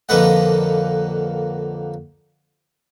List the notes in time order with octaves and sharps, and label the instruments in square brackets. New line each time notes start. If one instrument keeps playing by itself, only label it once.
[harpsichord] F2 D3 A#3 B4 D#5 F#5